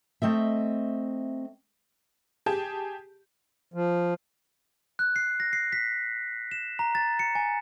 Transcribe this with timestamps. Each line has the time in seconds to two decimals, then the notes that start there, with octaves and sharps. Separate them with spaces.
0.22 A3 C4 D#5 E5
2.46 G4 G#4 A5
3.74 F3
4.99 F#6
5.16 C7
5.40 A#6
5.53 C7
5.73 B6
6.51 E7
6.79 A#5
6.95 A6
7.19 C#7
7.35 G#5